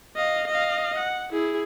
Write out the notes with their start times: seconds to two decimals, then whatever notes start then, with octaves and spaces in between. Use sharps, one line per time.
0.16 D#5 F5
0.47 D#5 F5
0.98 F#5
1.33 E4 G#4